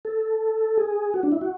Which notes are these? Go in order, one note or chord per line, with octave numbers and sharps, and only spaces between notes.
A4
G#4
F#4
D4
E4
F#4